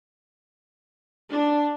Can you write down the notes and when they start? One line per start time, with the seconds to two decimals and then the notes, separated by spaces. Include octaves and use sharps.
1.31 D4